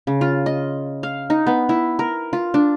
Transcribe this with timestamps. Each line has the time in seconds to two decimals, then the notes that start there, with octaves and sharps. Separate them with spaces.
0.07 C#3
0.21 F4
0.46 D#5
1.03 F5
1.30 D#4
1.47 B3
1.69 E4
1.99 A#4
2.33 F4
2.54 D4